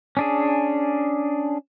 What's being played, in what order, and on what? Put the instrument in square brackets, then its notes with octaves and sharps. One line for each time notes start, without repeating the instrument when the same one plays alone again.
[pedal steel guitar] C#4 D4 G#4